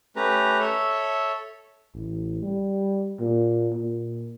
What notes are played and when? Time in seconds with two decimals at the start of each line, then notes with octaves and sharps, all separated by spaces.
0.16 A3 C#4 G4 B4 A#5
0.59 A4 C#5 E5
1.94 A1
2.42 G3
3.20 A#2
3.73 A#2